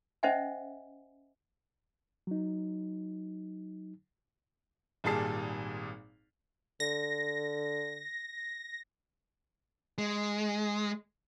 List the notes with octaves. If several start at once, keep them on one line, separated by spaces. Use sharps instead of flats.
C#4 C5 D#5 E5 F#5 G#5
F#3 D#4
G#1 A#2 G3 G#4 A5 C7
D3 A#6
G#3